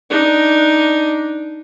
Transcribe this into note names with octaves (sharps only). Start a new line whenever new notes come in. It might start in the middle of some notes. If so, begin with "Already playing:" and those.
D4 D#4